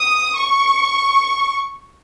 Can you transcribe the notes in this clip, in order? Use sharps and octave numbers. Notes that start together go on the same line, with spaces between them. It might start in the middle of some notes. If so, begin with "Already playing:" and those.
Already playing: D#6
C#6